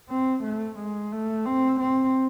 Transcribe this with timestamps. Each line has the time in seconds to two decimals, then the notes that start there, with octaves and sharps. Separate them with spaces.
0.10 C4
0.43 A3
0.78 G#3
1.12 A3
1.46 C4
1.80 C4